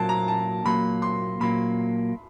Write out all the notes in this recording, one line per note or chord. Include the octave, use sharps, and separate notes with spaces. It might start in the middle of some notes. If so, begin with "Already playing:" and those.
Already playing: A#2 F#3 A#3 A5
A#5
A5
A#2 F#3 A#3 B5
C6
A#2 F#3 A#3 B5